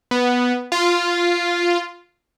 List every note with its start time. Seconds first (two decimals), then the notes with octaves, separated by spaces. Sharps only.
0.11 B3
0.72 F4